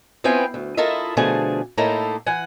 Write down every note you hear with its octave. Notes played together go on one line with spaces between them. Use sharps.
B3 C4 E4 F4 G5 G#5
D2
E4 F4 A4 A#4 D#5 E5
B2 D3 F3 A3 G#4 G#5
A2 A#3 D#4 E4 A4 A#5
E3 F#5 G#5